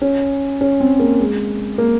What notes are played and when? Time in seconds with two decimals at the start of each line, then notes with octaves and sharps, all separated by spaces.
0.01 C#4
0.61 C#4
0.80 C4
1.00 A#3
1.19 G#3
1.78 A#3